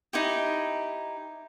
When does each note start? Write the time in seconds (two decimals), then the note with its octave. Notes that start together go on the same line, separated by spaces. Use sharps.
0.13 D#4 E4 G4